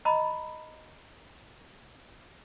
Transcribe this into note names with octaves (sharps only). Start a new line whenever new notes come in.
D#5 A#5 B5